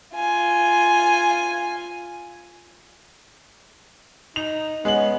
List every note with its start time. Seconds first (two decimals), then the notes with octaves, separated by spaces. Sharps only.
0.15 F4 G#5
4.36 D#4 F7
4.85 G#3 B3 C#4 F#7